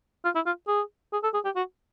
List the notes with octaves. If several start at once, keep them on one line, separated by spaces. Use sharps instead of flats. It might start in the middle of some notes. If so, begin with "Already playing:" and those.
F4
E4
F4
G#4
G#4
A4
G#4
G4
F#4